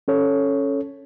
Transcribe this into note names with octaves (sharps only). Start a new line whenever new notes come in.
C#4 A4 C#5